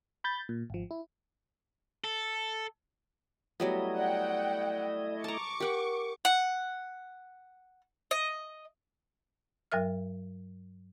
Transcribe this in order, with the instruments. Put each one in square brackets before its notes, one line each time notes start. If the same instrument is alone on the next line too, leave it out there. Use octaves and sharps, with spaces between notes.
[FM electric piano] B5 G6 A6
A#2
G#1 F3
E4
[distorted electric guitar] A4
[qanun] F#3 G3 B3 [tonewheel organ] A3 E4 D#5
[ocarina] D5 [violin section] F#5 G5
[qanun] A5 A#5 [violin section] C#6 D6
[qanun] G4 F#5 [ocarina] A#4
[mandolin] F#5
D#5
[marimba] G2 F#3 A#4 E5 F6